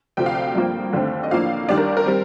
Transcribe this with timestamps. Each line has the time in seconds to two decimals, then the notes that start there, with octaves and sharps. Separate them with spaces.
0.17 D2 C3 F3 C4 G5
0.26 F5
0.35 G5
0.55 G2 F3 A#3
0.93 D#2 D3 A3 C4
1.23 D#5
1.31 A2 F3 A#3 D4 F5
1.68 D#2 D#3 G3 D4 D5
1.78 A#4
1.97 A#4
2.06 G3 C4